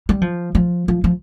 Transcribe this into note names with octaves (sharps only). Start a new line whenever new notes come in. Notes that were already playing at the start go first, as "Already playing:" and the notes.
G3
F3
F3
F3
F3